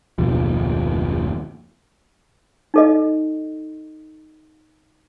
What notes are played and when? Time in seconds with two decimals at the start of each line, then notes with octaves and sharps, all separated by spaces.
0.18 F#1 D#2 B2 F3
2.74 D#4 A4 D#5